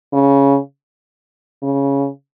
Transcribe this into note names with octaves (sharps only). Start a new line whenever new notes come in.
C#3
C#3